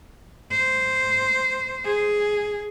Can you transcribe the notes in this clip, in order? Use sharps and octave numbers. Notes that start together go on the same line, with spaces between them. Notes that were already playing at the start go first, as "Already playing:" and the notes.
C5
G#4